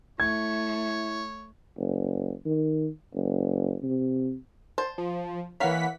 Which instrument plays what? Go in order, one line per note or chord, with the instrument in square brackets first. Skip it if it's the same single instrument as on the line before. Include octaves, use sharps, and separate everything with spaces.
[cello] A3 [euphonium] E4 [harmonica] C#5 [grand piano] G#6
[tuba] F#1
D#3
F#1
C3
[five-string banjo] C5 A5
[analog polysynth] F3
[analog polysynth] E3 F#5 B6 [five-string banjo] A#3 C#5 F5